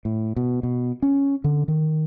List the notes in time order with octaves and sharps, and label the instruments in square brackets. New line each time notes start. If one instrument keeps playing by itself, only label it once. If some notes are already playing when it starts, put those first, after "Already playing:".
[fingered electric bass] A2
B2
B2
C#4
D3
D#3